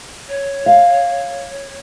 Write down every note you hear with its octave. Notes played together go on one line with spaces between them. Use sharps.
C#5
F5